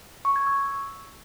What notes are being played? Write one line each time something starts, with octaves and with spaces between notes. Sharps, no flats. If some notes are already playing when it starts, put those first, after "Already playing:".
C#6
G#6
E6